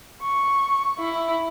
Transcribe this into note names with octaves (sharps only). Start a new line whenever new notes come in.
C#6
E4